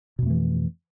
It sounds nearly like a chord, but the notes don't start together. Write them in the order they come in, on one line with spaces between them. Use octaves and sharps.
B2 F2 A3 E3